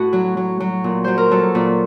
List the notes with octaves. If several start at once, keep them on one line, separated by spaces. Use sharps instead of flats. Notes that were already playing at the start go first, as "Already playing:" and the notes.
Already playing: A2 F#4
F#3
F#3
F#3
A#2
F#3 C5
A#4
F#3 A4
A#2